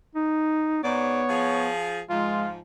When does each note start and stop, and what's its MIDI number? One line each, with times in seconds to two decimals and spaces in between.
0.15 0.82 63
0.84 1.23 44
0.84 1.70 59
0.84 1.74 73
0.84 1.23 74
1.29 2.01 53
1.29 2.01 68
2.10 2.58 44
2.10 2.58 53
2.10 2.46 56
2.10 2.52 65